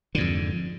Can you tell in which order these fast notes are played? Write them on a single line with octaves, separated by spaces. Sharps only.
D3 G#2 F2